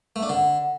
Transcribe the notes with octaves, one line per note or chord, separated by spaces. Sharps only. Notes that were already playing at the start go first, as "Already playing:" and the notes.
A3
D4
D3